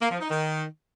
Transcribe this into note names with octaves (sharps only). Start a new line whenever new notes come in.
A#3
F3
D#4
D#3